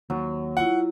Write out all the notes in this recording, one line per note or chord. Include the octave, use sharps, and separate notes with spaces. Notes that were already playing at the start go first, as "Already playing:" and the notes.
D#2 F#3
E4 F4 F#5